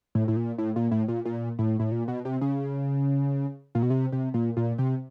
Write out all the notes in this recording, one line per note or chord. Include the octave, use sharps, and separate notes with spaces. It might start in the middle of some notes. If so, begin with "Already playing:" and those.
A2
A2
A#2
A2
A#2
A2
A#2
A#2
A2
A2
A#2
B2
C3
C#3
A#2
B2
C3
C3
A#2
A#2
C3